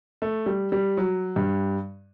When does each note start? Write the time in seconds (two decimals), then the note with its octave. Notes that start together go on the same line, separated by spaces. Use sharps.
0.22 A3
0.46 G3
0.72 G3
0.97 F#3
1.36 G2